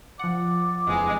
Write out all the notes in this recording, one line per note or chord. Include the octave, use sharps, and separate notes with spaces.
F3 D5 F#5
D#1 F2 E3 G#3